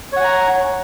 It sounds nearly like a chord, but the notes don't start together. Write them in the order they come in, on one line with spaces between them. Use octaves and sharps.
C#5 F#5 G#5 A#5